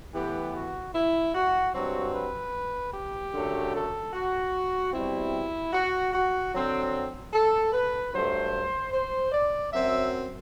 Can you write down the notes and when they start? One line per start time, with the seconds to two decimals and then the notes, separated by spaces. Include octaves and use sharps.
0.14 A2 E3 B3 G4
0.54 F#4
0.94 E4
1.35 F#4
1.74 G2 F#3 C4 F#4
2.14 B4
2.94 G4
3.34 F#2 D3 F#3 A3
3.73 A4
4.13 F#4
4.93 B2 G3 C4 E4
5.73 F#4
6.13 F#4
6.53 D3 F#3 C4
7.33 A4
7.72 B4
8.13 G2 F#3 A3 C5
8.92 C5
9.32 D5
9.72 F#2 F#3 C4 E5